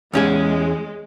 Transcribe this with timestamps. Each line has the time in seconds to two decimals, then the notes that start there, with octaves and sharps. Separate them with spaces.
0.13 E2 G#3 C#4 G#4